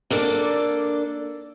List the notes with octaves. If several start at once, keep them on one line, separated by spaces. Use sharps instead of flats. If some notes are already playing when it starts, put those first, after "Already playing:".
A#3 D4 A4 D5